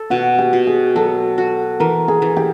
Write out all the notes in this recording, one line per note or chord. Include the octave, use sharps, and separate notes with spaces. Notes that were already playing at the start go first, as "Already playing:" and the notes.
Already playing: A4
B2 F#4
G4
B2
G#4
F#3 A4
F#4
E3 A#4
G#4
E3
G4